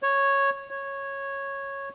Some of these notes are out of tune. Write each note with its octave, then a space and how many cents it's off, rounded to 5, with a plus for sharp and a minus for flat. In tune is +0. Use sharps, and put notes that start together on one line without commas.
C#5 -5
C#5 -10